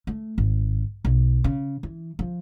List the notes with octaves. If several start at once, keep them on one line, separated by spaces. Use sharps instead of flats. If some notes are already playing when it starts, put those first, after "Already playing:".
A3
G#1
B1
C#3
E3
F3